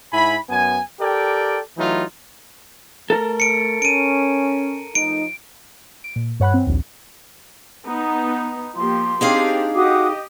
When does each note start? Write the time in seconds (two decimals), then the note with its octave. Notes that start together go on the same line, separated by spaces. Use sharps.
0.13 G#2 E4 G#5 B5
0.50 F#2 B3 G#5
1.00 G4 A4 A#4 D5 G5
1.77 E3 F#3 A3 D#4 F4
3.10 A3 A4 A#4
3.40 C#7 D7
3.82 C#4 D7 D#7
4.95 F3 A3 D#4 D7
6.04 D7
6.16 A#2
6.40 G2 C#5 F#5 B5 F#6
6.54 C4
6.67 A#1 D#2
7.84 B3 D#4
8.75 F3 A#3 G4 C6
9.21 C4 D4 D#4 G4 G#4 F5
9.75 F#4 G4 D#5 D6 D#6